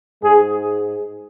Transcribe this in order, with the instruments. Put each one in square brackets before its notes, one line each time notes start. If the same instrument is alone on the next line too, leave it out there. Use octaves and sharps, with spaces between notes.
[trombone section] G#2 G#3 G#4